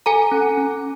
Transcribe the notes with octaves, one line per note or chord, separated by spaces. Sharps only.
A4 G#5 A#5
C#4
C#4